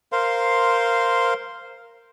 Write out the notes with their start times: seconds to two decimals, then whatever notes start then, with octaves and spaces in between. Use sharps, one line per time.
0.12 A#4 C5 F5 C6